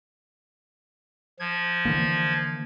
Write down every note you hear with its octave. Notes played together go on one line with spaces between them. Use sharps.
F3 G#6
D3 E3 A#3